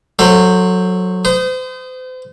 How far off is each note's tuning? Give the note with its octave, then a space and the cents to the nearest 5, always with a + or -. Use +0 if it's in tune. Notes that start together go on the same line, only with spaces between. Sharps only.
F#3 -15 A4 +10 C5 +0
C5 -40 D#6 +0